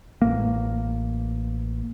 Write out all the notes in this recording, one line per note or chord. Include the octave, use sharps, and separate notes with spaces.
A1 A#3